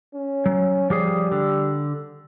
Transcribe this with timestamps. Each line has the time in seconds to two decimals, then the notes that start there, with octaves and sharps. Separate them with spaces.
0.14 C#4
0.46 F#3
0.90 F3 G3 G4 G#4
1.32 D3